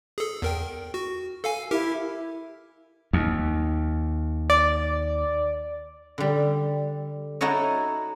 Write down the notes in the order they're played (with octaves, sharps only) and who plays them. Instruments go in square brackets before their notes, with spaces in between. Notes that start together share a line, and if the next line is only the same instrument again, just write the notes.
[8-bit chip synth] G#4 A4
E2 A#4 G5
F#4
A4 F5 G#5
[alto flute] E4 [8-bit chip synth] G4 A#4
[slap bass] D#2
[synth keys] D5
[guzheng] D3 G3
D#4 E4 F#4 A4 C#5 D#5